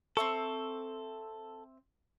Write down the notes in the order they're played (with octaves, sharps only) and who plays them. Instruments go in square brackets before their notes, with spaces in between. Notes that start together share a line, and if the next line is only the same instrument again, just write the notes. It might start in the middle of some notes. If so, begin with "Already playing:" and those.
[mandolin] C4 E5 C#6 [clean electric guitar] A4